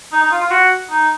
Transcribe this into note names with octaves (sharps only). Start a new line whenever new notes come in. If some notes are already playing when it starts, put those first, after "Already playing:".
D#4
D#4
F4
F4
F#4
D#4